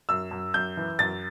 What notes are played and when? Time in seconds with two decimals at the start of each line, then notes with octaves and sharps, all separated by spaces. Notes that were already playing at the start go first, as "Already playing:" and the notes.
0.09 F#2 E6
0.31 F#2
0.54 F#2 G6
0.77 E3
0.99 F#2 A6